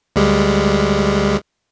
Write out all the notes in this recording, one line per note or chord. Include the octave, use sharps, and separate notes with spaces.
D2 G3 G#3